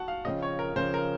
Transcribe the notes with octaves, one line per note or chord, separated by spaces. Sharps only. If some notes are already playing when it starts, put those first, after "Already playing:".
Already playing: F#4 F#5 A5
F5
C#3 F3 C4 D#5
C#5
A#4
C#3 F3 C4 C5
A#4